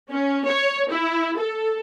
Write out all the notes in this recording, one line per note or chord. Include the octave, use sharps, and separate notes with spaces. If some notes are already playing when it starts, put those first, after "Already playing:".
C#4
C#5
E4
A4